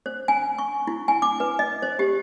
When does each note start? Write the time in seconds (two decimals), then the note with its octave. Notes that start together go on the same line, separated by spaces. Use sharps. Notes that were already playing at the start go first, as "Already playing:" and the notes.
0.06 C5
0.28 G#5
0.59 C#6
0.87 E4
1.08 G#5
1.22 D6
1.40 B4
1.59 D#5
1.82 C5
1.99 G4